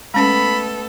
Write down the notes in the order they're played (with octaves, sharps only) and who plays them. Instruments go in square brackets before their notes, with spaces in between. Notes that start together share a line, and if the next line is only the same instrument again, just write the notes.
[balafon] G#3 C#4 [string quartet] A3 B3 A4 [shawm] B5